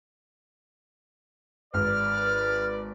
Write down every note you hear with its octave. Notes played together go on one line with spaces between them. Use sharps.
G#1 B4 D5 F6